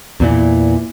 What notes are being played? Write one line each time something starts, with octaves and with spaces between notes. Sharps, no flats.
E2 A#2 E3